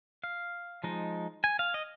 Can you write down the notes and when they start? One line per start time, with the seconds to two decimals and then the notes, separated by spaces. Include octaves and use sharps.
0.24 F5
0.84 F3 G#3 D#4
1.44 G#5
1.59 F5
1.74 D#5